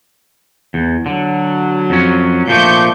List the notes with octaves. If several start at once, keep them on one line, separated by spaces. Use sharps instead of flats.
E2
D3 F#3
F2 C#4
A#2 F3 A3 C#6 D6 G6